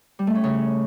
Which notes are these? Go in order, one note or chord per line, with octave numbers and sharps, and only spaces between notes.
G3
A3
C#4
C#3